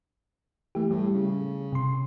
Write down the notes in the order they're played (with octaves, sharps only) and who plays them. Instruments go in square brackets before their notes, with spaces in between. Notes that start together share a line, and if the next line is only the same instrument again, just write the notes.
[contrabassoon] E3 [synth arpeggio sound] A3 G4
[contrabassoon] A2 [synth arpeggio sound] G3
[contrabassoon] C#3
[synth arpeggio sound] C3 C6